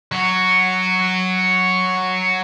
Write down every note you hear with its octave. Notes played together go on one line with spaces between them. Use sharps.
F#3 F#4